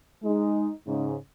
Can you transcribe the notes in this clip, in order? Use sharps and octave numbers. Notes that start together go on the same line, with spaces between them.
G#3 D#4
G#2 C#3